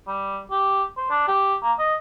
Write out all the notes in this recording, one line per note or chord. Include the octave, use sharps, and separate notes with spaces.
G3
G4
C5
D4
G4
A#3
D#5